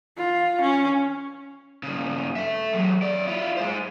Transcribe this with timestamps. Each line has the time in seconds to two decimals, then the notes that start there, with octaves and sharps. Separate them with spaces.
0.17 F4
0.61 C#4
1.83 G2 C#3
2.36 A4 E5
2.73 F#3 G#3
3.02 F#2 D5
3.27 E4 F4
3.57 G#3 C5